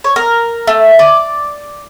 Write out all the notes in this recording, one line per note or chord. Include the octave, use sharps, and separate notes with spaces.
C#5
A#4
A3
D5